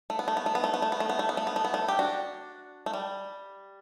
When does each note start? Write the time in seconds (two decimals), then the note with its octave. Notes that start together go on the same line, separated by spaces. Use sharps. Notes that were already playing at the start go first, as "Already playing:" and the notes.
0.10 A3
0.19 B3
0.28 A3
0.37 B3
0.46 A3
0.55 B3
0.64 A3
0.74 B3
0.82 A3
0.92 B3
1.00 A3
1.09 B3
1.19 A3
1.29 B3
1.37 A3
1.47 B3
1.56 A3
1.65 B3
1.74 A3
1.88 G4
1.99 D4 F#4
2.86 A3
2.93 G3